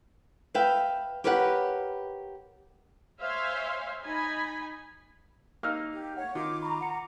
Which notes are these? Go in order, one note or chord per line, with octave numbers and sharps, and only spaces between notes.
B4 E5 F5 G5
G4 A#4 B4 C#5 E5 F#5
C5 C#5 E5 F5 G#5 C6
D#4 G#5 B5
A#3 D#4 F5 E6 F6
G4
C#5 F#5
D#3 F4 D6
A#5 B5 C#6 D6
F#5 C#7